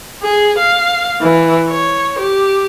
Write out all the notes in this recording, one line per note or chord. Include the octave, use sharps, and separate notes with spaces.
G#4
F5
E3
C#5
G4